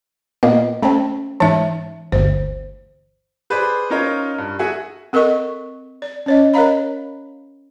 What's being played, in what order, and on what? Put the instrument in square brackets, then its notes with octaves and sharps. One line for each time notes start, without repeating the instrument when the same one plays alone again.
[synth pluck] A#2 A#3 B3 [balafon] D#5
[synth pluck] A3 C4 [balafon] C#4 A5
[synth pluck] G#2 A5 [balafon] E3 E5
[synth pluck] G1 D2 [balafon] C5
[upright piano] G#4 B4 C5 D5 B5
C#4 D#4 F4 A#4 C#5
G2
F#4 G#4 E5 F#5 G#5
[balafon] C4 A4 A#4 D#5 C#6
D5
C#4 C#5 D#5
A#4 C#5 D#5 F5 A#5 B5